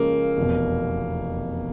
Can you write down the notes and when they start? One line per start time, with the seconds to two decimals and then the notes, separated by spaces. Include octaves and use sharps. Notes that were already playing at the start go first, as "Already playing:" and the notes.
Already playing: C#3 F3 G#3 A#3 C#4
0.37 F1 E2 B2